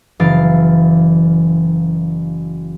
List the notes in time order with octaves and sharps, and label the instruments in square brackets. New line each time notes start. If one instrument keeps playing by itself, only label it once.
[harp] F#1 E3 F5 F6 A6 D7